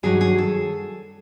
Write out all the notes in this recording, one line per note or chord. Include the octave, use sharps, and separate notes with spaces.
G2 D#3 F#3 G#4
G#4
A4